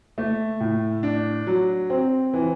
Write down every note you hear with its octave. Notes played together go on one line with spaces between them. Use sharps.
A3
A2
D4
F#3
C4
E3